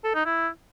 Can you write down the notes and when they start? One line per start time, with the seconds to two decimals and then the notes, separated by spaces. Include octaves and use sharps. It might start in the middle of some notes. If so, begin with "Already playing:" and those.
0.04 A4
0.15 D#4
0.26 E4